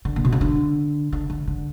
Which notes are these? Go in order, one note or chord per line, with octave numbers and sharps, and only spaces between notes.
D3
A#2
B2
C#3
D3
D3
D3
D3